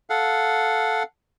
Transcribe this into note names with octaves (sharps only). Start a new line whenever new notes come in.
A4 F5 F#5